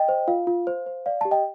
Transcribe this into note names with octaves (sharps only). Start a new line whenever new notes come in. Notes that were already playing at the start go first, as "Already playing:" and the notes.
Already playing: D#5 G5
C5
F4 F5
F4
C5
C5
D5 F5
G4 A5
D#5 G5